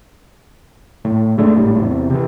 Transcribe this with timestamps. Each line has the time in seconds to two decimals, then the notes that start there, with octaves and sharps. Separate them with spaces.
1.05 A2
1.37 F1 G#3 A3 D4
1.57 G#1 A2 G3
1.79 E2 C3
2.10 C3 E3